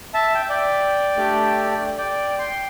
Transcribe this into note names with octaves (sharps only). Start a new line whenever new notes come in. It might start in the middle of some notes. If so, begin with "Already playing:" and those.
E5 A5
G5
E5
D5 G5
A3 D4 G4
D5 G5
G5 C6